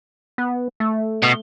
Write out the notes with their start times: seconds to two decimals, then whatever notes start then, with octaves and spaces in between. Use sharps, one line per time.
0.38 B3
0.80 A3
1.23 B2